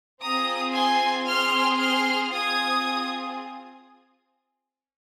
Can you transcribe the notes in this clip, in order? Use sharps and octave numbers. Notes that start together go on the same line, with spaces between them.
C4 F4 G#4 A#5 D#6
G#5 C6
C4 G#4 C6 F6
C6 F6
C4 F4 G#4 D#6 G#6